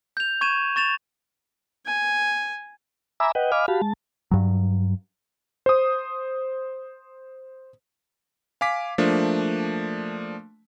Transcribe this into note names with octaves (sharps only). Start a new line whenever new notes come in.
G6 F7
C#6 G#6 D#7 E7
C#6 A6 E7 F7
G#5
E5 G#5 A#5 B5 D6 E6
B4 D#5 F#5 G5
D#5 F5 G#5 B5 D6 F6
F#4 G4 F5 A5 B5
G#3 A5
G2 F#3
C5 D#6
F5 G#5 D6 B6
F3 A3 A#3 D4